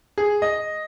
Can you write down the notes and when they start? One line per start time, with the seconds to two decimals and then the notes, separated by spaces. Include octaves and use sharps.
0.18 G#4
0.42 D#5